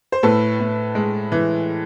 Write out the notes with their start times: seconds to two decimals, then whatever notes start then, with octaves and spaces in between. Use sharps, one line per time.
0.12 C5
0.23 A2 A4 B4
0.59 A2
0.95 G#3
1.32 E3